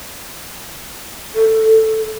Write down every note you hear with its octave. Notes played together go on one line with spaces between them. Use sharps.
A4